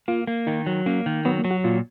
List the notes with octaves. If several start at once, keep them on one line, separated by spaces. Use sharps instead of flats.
A#3 F4
A#3
D#3 D#4
F#3
A#3 C#4
D#3
F#3 B3
A#3
F#3
F#4
A#2 F4